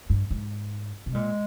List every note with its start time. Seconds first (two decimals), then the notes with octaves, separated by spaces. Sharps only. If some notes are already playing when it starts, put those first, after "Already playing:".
0.10 G2
0.31 G#2
1.06 C3
1.14 A#2 G#3